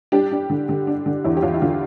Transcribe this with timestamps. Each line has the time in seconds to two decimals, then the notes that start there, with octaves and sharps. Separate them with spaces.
0.12 G3 D4 G4
0.32 D4
0.50 D3
0.69 D3
0.87 D4
1.06 D3
1.24 E2 E4
1.37 G4
1.42 E2 F4
1.54 E4
1.62 D3 F4